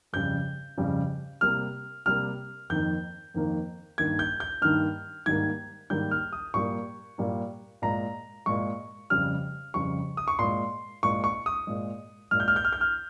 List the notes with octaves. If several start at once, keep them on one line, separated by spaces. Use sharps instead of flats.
F2 C#3 G3 G6
F2 C#3 G3
C3 G3 A#3 F6
C3 G3 A#3 F6
F2 D#3 A#3 G6
F2 D#3 A#3
G2 D#3 A#3 G#6
G6
G6
G2 D#3 A#3 F6
G#2 D#3 G3 A#3 G#6
G#2 D#3 G3 A#3 G6
F6
D#6
A#2 G3 A#3 C#6
A#2 G3 A#3
A#2 G#3 A#5
A#2 G#3 C#6
F2 C#3 G3 F6
F2 C#3 G3 C#6
D#6
C#6
A#2 G#3 C6
A#2 G#3 C#6
C#6
D#6
A#2 G#3
A#2 G#3 F6
G6
F6
G6
F6
G6
F6